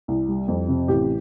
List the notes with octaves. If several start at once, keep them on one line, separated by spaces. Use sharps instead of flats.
C2
G3
F2
C3
A1 G4